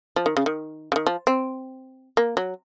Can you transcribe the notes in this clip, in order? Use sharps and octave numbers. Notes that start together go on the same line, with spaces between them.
F3
D#3
C#3
D#3
C#3
D#3
F3
C4
A#3
F#3